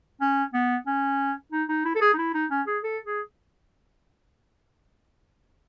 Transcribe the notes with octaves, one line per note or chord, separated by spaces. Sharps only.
C#4
B3
C#4
D#4
D#4
E4
A4
G#4
D#4
E4
D#4
C#4
G#4
A4
G#4